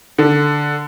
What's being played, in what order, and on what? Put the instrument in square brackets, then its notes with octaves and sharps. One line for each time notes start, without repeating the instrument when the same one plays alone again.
[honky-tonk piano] D3